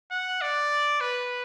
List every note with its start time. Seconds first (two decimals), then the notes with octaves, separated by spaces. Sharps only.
0.11 F#5
0.42 D5
1.01 B4